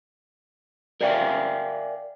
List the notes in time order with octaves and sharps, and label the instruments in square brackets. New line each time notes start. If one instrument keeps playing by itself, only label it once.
[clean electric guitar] A#4 D5 E5 F5 G5 G#5